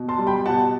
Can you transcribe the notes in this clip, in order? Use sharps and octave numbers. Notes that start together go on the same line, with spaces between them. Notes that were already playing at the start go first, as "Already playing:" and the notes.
Already playing: B2
A5 C6
G3
G5 B5
B2 F#5 A5